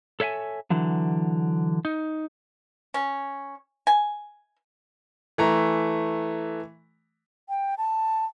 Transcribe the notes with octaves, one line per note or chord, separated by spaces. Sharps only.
A4 C#5 E5 F#5 G#5
D3 E3 F#3
D#4
C#4
G#5
E3 A3 A#5
G5
A5